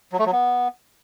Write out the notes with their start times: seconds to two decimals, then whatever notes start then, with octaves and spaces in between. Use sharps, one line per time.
0.13 F#3
0.19 A3
0.26 F#3
0.32 B3